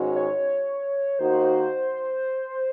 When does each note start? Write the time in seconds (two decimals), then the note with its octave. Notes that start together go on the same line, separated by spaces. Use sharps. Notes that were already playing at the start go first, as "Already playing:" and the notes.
Already playing: G#2 D#3 G#3 C#4 F#4
0.16 C#5
1.18 D#3 A#3 D#4 F#4 C5